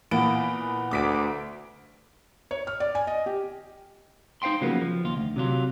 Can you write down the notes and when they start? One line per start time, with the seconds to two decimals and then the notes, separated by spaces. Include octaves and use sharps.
0.11 A#2 E3 A#3 B3 B4 D7
0.91 D2 D6 B6 D7
2.51 C#5
2.67 F6
2.80 D5
2.95 G#5
3.07 D#5
3.26 G4
4.42 D#4 C5 F5 G5 C6
4.61 C#3 F3 F#3 A#3 B3
4.82 F3
5.05 D#2 F4
5.17 D2
5.36 C3 F#3 F4